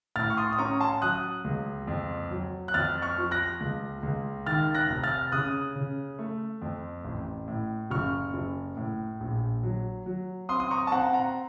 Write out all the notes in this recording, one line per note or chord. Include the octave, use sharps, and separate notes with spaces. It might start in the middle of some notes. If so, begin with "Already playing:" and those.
A2 F6 A6
C#6
C6 D#6
D#6
C#4 A#5 C#6
A5 C6
F#3 D#6 F#6
C#2
F2
F#3
F#6
F2 F6 A6
C#6 F6
F3
F#6 A#6
C#2
C#2
D#3 F6 A6
F#6 A#6
F1
F6 A6
C#3 D#6 F#6
C#3
A3
F2
A1
A2
F#1 C#6 F6
F#1
A2
A#1
F#3
F#3
C4 C6 D#6
D#6
A#5 C#6
A5
C4 F#5 A#5
F#5 A#5